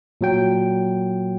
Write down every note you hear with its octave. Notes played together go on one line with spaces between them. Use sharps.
A#2 F#3 G5